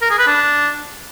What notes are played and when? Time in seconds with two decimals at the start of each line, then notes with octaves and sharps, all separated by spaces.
0.02 A#4
0.10 G#4
0.19 B4
0.27 D4